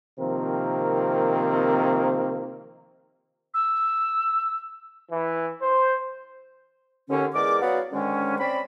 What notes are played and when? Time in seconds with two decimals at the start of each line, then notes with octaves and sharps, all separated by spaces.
0.18 C3 D#3 F3 A#3 C4 A#4
3.54 E6
5.10 E3
5.61 C5
7.10 D#2 D3 C#4
7.34 E2 G#3 A#4 D5 D6
7.61 F#3 B3 F#4 D5 F5 F#5
7.93 G#2 D3 D#3 G#3 C#4
8.40 C4 C#4 D5 B5